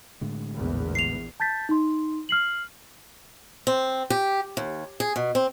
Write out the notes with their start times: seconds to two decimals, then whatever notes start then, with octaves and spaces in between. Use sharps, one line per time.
0.21 A2 D3 G#3
0.55 A#1 E2
0.95 C7 F7
1.40 A5 G6 A6 B6
1.69 D#4 C6
2.29 F6 C7 F#7
3.67 C4
4.10 G4
4.57 D#2
5.00 G#4
5.16 B2
5.35 C4